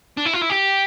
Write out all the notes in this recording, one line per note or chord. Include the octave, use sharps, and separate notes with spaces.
D4
E4
F4
E4
G4